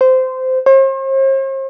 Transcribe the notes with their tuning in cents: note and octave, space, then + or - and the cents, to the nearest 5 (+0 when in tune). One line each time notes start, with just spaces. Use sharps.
C5 -15
C5 +45